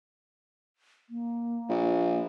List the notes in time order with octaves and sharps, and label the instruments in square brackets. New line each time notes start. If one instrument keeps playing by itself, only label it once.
[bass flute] A#3
[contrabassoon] A#1